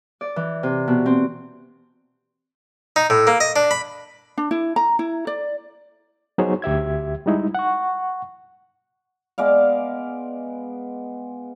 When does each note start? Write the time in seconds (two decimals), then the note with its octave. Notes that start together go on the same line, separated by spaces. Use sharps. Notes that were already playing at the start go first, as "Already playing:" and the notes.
0.21 D5
0.36 E3
0.63 C3
0.88 B2
1.06 C4
2.96 D#4
3.10 A2
3.27 A#3
3.40 D#5
3.56 D4
3.71 B5
4.38 D4
4.51 E4
4.76 A#5
4.99 E4
5.27 D5
6.38 F#3 B3 D#4 G#4 C5 C#5
6.62 D2 G4 E5 G#6
7.26 G3 G#3 D#4 E4
7.55 F#5 C#6
9.38 G#3 B3 D5 F5